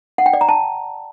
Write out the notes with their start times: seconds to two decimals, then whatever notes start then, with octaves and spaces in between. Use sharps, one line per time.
0.18 F#5
0.26 G5
0.33 D5
0.41 A#5
0.49 A5